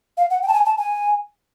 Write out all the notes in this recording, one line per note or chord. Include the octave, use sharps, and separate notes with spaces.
F5
F#5
G5
A5
G#5
A5
G#5